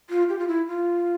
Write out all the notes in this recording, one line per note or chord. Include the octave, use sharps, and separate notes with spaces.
F4
G4
F4
E4
F4